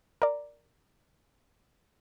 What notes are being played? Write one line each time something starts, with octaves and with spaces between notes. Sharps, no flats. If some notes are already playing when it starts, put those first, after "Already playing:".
A#4 D5